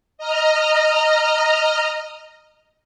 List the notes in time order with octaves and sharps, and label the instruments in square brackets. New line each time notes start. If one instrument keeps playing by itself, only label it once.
[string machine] D#5 A#5 F6